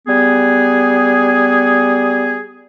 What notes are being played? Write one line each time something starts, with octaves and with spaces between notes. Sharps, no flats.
G3 B3 G#4